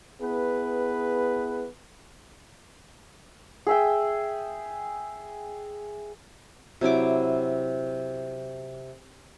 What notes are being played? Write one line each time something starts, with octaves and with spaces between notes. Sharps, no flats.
B3 E4 G#4 B4
G#4 E5 G5
C3 F#3 E4 D6